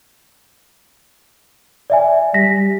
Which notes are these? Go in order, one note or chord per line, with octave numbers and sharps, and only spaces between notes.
D5 E5 G#5
G3 A#6 B6